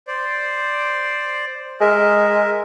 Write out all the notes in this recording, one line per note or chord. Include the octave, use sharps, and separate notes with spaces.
C5 D5
G#3 A#4 D#5 E5